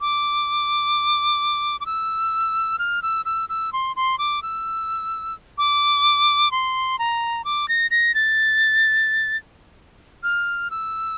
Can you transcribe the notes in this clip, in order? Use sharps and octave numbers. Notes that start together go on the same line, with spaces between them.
D6
D6
E6
F6
E6
E6
E6
C6
C6
D6
E6
D6
C6
A#5
D6
A#6
A#6
A6
F6
E6